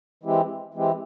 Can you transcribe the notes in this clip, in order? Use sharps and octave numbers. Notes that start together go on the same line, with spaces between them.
E3 G#3 C4 E4 G4
E3 G#3 C4 E4 G4